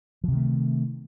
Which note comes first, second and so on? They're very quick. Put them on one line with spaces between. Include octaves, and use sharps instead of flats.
F3 C3 D#3 A3